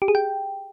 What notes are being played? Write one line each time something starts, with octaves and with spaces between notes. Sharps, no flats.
G4
G#4
G5